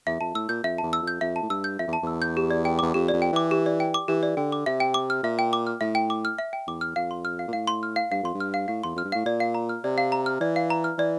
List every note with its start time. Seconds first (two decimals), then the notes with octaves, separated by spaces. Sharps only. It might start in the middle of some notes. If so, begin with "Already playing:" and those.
0.07 E2 E5
0.21 F2 A5
0.35 A2 E6
0.49 A#2 G6
0.63 F2 E5
0.78 E2 A5
0.93 E6
1.02 F2
1.07 G6
1.21 F2 E5
1.36 A5
1.43 A2
1.49 G2 E6
1.64 G6
1.79 F2 E5
1.88 E2
1.93 A5
2.03 E2 E6
2.22 G6
2.37 G4
2.51 D5
2.65 G5
2.79 E2 D6
2.94 F2 G4
3.09 F2 D5
3.22 G5
3.32 E3 D6
3.51 G4
3.66 D5
3.80 G5
3.94 D6
4.08 E3 G4
4.23 D5
4.37 D3 G5
4.52 D6
4.66 C3 E5
4.80 G5
4.94 D6
5.10 F6
5.23 A#2 E5
5.39 G5
5.53 D6
5.67 F6
5.81 A2 E5
5.95 G5
6.10 D6
6.25 F6
6.38 E5
6.53 G5
6.67 E2 D6
6.81 F6
6.96 F2 F5
7.11 C6
7.25 F6
7.39 F5
7.48 A#2
7.53 A2 F5
7.67 C6
7.83 F6
7.96 F5
8.11 G2 F5
8.23 F2 C6
8.35 G2
8.40 F6
8.54 F5
8.68 A2 F5
8.84 E2 C6
8.95 F2 F6
9.05 G2
9.12 A2 F5
9.26 A#2 D5
9.40 F5
9.55 A#5
9.69 F6
9.84 C3 D5
9.98 F5
10.12 A#5
10.26 F6
10.41 E3 D5
10.56 F5
10.70 A#5
10.84 F6
10.98 E3 D5